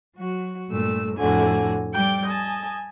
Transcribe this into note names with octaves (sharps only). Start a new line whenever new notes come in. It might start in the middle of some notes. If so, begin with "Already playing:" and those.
F#3 F#4
G2 A#2 A3 E6
F2 A2 D3 F#4 G#5
G3 G5 D6 G6
D#5 G#5 A5